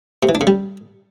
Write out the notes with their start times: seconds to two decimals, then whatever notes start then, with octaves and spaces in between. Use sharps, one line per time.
0.23 C3
0.29 E3
0.35 D4
0.41 C#3
0.47 G3